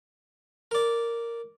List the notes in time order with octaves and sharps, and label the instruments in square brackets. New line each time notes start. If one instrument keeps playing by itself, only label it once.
[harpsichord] A#4 D5